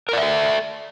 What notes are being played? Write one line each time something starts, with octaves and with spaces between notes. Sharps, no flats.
A4 A#4 D5 E5